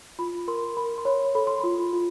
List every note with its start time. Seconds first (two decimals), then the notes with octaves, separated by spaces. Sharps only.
0.19 F4 B5
0.48 A#4 C6
0.77 A#4 B5
0.98 C6
1.05 C#5 B5
1.35 A4 B5
1.47 C6
1.60 F4 B5
1.93 F4